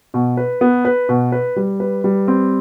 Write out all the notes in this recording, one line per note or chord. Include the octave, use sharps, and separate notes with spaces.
B2
B4
B3
B4
B2
B4
G3
B4
G3
C4